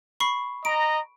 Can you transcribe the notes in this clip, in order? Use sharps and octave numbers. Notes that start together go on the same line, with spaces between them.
B5 C#6 C7
D#5 A#5 D7